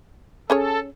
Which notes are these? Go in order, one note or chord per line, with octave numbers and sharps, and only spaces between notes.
C#4 G#4 A4 C#5